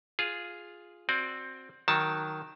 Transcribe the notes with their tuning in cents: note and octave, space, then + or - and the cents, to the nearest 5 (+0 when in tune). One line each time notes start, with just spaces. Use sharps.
F4 +0 G#4 +0
C4 +10 F#4 -15 D5 +5
D#3 +0 F#3 +0 A5 +0